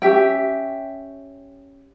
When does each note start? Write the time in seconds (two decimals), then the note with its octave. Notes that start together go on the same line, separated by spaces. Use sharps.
0.02 C#4 G4 E5 G5